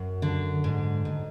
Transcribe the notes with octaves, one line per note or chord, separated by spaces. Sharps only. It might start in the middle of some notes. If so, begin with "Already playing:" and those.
Already playing: F#2 F#4
D3
G#2
G#2